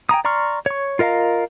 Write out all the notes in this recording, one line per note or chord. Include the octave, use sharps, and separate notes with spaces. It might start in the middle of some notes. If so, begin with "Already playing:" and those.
G5 G#5 A#5 D#6
D5 A#5 C6 C#6 F6
C#5 C#6
F4 A#4 D#5 F5 A#5